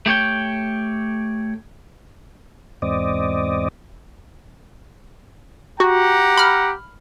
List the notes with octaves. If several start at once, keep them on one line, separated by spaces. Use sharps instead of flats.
A3 G4 C#5 G5
E2 G#2 C4 D5 D#5
F#4 G4 F#5 A#5
B5 F6